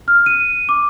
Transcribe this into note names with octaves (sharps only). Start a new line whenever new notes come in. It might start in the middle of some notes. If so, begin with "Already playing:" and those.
F6
D#7
D6